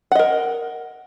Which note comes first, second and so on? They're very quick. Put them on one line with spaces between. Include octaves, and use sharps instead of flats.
F#5 D#5 A#4